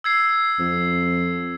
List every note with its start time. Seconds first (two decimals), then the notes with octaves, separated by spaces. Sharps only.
0.04 E6 G#6 C7
0.59 F2